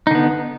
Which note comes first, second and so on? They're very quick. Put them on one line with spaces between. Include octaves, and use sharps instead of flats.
D#4 D3 B3